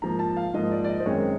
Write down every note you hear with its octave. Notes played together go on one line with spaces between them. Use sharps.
G#2 F3 A#3 A#5
A5
F5
G#2 F3 A#3 D#5
D5
D5
D#5
C5
F#2 D#3 G#3 C4 C#5